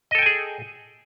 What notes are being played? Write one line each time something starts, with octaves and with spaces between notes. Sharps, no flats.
G#4 A4 D#5 G5 G#5